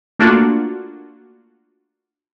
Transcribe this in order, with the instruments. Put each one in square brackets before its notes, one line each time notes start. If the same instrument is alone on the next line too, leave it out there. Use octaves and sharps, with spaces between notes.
[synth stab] A3 A#3 D4 F4 F#4